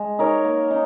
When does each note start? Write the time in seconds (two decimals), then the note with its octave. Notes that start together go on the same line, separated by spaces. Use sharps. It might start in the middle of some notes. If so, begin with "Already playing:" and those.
Already playing: G#3
0.19 D#4 A#4 C#5
0.45 A#3
0.71 D#4